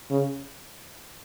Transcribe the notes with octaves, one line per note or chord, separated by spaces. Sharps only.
C#3